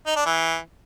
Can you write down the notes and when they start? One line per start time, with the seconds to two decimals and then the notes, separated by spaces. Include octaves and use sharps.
0.06 D#4
0.16 D4
0.26 E3